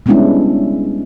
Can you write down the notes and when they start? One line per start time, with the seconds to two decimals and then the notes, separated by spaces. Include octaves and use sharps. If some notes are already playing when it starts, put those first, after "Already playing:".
0.06 G3 G#3 B3 C#4 D4 E4